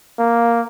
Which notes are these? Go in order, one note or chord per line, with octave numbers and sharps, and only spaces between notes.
A#3